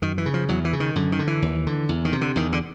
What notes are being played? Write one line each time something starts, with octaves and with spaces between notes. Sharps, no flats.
F#2 D#3
E3
C#3
F3
E2 F#3
E3
C#3
D#3
F#2 D3
D#3
D3
E3
D#2
D3
E2
D#3
C3
D3
E2 D#3
D3